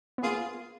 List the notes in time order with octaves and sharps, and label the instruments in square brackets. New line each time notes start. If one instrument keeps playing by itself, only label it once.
[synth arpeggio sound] B3
[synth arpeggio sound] A#3 [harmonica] F4 G#4